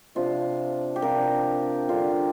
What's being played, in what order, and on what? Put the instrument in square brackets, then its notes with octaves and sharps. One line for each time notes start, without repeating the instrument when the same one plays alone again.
[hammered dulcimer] C3 F3 D4 F4
G4
C3 F3 D4 A#4
D3 G3 C4 F4